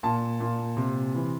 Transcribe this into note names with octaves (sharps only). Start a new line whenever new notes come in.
A#2 A5
A#2
C3
E3